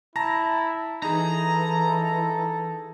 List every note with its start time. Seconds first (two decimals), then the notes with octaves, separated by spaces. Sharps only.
0.16 E4 A5 A#5 A#6
1.02 E3 D#4 G#4 A4 A#5